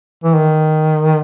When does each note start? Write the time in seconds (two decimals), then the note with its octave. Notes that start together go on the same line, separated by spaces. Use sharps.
0.24 E3
0.35 D#3